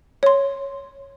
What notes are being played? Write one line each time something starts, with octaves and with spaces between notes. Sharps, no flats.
C#5 C6